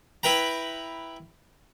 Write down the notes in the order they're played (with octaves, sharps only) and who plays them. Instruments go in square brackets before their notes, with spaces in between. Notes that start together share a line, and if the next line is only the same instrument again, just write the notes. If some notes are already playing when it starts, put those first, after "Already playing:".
[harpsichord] E4 B4 G5 A#5